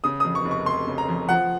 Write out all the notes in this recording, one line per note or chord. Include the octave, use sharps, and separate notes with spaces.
C#3 D#6
F2 D#6
C#6
F1
C#6
F1 C6
C#3
A#5
F2
F3 F#5